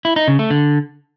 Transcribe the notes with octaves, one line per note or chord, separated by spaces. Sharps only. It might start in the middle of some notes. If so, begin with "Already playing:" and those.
E4
D#4
C#3
A3
D3